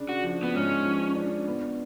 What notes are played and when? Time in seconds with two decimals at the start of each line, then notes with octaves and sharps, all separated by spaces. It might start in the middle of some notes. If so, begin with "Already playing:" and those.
Already playing: C#3 D4
0.09 F#4
0.23 F3
0.43 B3
0.54 G#2 C#4
0.85 F3
1.15 D4
1.47 B3